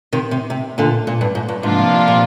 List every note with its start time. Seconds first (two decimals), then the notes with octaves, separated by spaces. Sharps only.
0.13 C3 D#3
0.31 C3
0.50 C3
0.78 A#2 D3
1.07 A#2
1.21 G2
1.35 G#2
1.49 G2
1.63 G#2 C3 F3 A#3 D4 F4
2.08 A#2